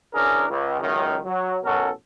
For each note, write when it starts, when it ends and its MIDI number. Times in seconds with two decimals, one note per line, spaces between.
0.14 0.45 52
0.14 0.45 61
0.14 0.45 62
0.14 0.45 68
0.14 0.45 70
0.49 0.78 37
0.81 1.18 37
0.81 1.18 42
0.81 1.18 51
1.25 1.57 54
1.63 1.89 33
1.63 1.89 47
1.63 1.89 61
1.63 1.89 66
1.63 1.89 69
1.63 1.89 70